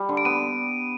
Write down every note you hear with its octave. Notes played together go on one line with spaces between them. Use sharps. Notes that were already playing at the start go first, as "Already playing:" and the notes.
Already playing: G3
D3
D7
B3 D#7